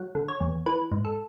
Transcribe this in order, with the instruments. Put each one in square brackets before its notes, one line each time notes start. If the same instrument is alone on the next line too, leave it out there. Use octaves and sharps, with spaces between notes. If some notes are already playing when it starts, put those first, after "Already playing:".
Already playing: [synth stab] F#3 F#5
D3
C#5
E2
E3 B4
G#2
A4